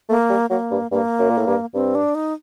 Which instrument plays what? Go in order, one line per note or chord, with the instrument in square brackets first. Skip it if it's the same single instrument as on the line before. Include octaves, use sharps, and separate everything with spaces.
[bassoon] A3 [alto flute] A#3
[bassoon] G3
[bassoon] F#3 [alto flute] A#3
[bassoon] G2
[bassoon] G2 [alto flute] A#3
[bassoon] F#2
A#2
A2
G2
[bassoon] G2 [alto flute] C4
[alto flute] D4
D#4